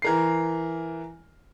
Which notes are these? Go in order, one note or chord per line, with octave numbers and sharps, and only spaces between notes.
E3 A#4 C7